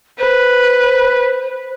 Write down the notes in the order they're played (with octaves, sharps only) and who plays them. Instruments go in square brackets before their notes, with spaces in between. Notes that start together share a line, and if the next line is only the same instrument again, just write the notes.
[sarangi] B4 [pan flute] C5